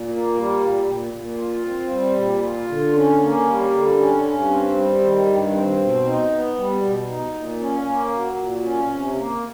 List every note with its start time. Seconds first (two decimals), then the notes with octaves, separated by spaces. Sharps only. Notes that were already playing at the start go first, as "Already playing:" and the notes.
Already playing: A#2
0.09 A#3
0.34 G3
0.60 A#2
0.86 A#2
1.13 A#2
1.38 F4
1.64 C4
1.90 G3
2.16 A#2
2.42 F4
2.68 D3
2.94 C#4
3.19 A#3
3.46 G3
3.71 D3
3.97 C#4
4.23 G2
4.48 C4
4.75 G3
5.01 D#3
5.26 G2
5.52 C4
5.78 B2
6.04 D#4
6.31 B3
6.56 G3
6.81 B2
7.07 D#4
7.33 A#2
7.60 C#4
7.86 A#3
8.12 F#3
8.37 A#2
8.63 C#4
8.89 C3
9.15 A#3